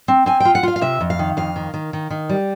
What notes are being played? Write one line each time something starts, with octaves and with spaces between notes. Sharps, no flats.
C4
C4 G#5
G5
F4
F#5
F4 F5
F5
C3 E5
F2
F5
D#3
F2 F5
D#3
D#3
D#3
D#3
G3